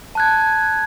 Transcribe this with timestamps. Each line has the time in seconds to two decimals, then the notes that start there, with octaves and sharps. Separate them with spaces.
0.15 A5 F#6 G#6